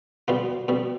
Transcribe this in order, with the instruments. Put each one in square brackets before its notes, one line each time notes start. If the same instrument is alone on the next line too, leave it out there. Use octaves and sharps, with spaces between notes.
[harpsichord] B2 G3 F4
B2 G3